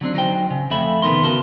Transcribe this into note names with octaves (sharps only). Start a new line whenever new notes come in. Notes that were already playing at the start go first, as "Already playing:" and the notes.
D3 F#3 C4 D4
F#3 D#4 A#4 C5 G5
C#3
F2 A3 E5 B5
C3 D#3 B3 D#4 A#4 C6
C#3 B3 F#4 A#4 A5 C6